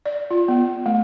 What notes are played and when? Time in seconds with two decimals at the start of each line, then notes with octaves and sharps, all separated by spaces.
0.06 D5
0.31 F4
0.48 B3
0.86 A3